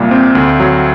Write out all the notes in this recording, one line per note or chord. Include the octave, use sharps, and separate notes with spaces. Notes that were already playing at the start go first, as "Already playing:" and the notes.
Already playing: C2 A#2 G3 G4
C4
D2
F#3